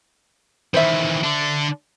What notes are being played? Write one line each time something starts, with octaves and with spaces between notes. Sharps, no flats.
D#3 E3 C5 E5
D3 D4